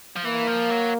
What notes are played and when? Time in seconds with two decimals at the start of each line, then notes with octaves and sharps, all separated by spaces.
0.16 F3
0.25 E3 A#3
0.47 F3
0.70 F#3